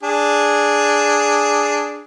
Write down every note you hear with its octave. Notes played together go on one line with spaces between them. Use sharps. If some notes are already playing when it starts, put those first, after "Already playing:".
D4 G#4